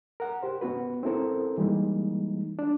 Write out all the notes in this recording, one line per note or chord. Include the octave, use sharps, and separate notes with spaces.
A#4 F#5
G4 C5
B3 C#4 F#4 B4
C4 C#4 E4 A4 A#4 C5
E3 G3 G#3 A#3 D#4
D4